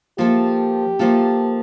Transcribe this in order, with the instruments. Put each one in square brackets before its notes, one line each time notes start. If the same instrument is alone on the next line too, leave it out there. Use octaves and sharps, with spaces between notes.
[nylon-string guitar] F3 A#3 F4 A4 [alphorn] G4
[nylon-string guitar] F3 A#3 F4 A4